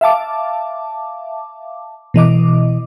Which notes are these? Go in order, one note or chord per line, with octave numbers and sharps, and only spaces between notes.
E5 F5 A5 D6
B2 E3 D#5 D6